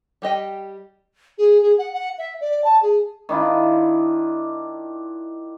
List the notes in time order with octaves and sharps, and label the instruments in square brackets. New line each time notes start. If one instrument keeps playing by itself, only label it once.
[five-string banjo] G3 G4 D#5 G5
[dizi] G#4
G#4
F#5
F#5
E5
D5
A5
G#4
[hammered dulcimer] D#3 D4 E4 F4